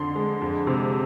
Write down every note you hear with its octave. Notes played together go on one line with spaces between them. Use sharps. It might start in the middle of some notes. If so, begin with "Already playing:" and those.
Already playing: F2 D3 C6
G#3
F2
C3